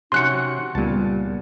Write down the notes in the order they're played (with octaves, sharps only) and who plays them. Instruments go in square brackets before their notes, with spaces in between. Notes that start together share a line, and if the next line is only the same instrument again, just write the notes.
[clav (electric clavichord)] C3 C#4 F#4 [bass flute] D#4 [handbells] C6 F#6 C#7
[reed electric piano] C#2 G3 [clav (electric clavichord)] A#2 A5 [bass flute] B3